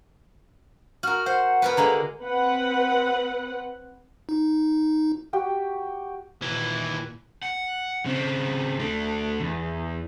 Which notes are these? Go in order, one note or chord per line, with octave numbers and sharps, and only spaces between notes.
F#4 A#4 F6
C5 F#5
B3 A#4 B4
D3 G#3 A#3 A#5
C4 B4 F#5
D#4
F#4 G4 G5
D#2 A#2 E3
F#5
C#3 C4
D2 D3
E2